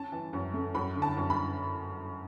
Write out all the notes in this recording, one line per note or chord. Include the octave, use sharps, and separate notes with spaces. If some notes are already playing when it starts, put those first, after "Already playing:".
Already playing: C#4 A5
E3
F#2
A3
F#2 B5
D3
A5
F#2
B5